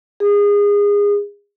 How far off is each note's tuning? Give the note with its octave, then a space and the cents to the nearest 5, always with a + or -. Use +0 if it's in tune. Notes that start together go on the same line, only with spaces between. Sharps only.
G#4 -25